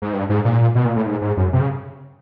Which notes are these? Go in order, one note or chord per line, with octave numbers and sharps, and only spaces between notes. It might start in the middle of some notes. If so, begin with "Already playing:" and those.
G#2
G2
G#2
A#2
B2
A#2
A2
G#2
G#2
F#2
C3
C#3